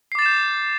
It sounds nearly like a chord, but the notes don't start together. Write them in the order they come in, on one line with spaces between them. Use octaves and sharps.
C7 D6 A6 E7 G6